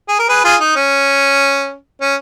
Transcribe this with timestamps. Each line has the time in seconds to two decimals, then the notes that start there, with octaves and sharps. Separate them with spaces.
0.08 G#4
0.19 A#4
0.29 G#4 B4
0.44 F4 G#4
0.60 D#4
0.76 C#4
2.01 C#4